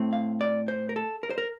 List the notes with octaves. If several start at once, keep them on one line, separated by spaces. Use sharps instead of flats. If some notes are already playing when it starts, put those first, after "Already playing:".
Already playing: A2 A3 C4
F5
D5
C5
A#4
A4
A#4
C5
A#4